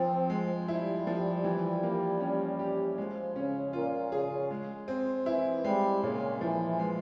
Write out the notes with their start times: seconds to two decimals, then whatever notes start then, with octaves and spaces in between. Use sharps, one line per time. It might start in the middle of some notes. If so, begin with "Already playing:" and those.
Already playing: F3 C4
0.30 G#3
0.68 G3 E4
1.07 F3
1.44 E3
1.83 A#3
2.20 C#4
2.59 G4
2.98 F3 G#3
3.35 C#3 C#4
3.73 A#2 F4
4.12 C#3 G#4
4.51 G#3
4.88 C4
5.26 E3 E4
5.64 G3 G#3
6.02 A#2 C#3
6.40 E3 F3
6.79 G#3